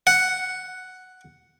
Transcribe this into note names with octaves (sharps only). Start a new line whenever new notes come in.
F#5